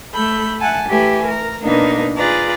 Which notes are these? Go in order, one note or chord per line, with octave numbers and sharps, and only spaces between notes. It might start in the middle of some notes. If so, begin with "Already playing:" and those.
A3 A4 B5 G6
E5 F#5 G#5 A5
E3 A3 G4 G#5
A#4 A#5
B2 A#3 B3 D4 D#4 A#4
F4 G#4 B4 D5 A#5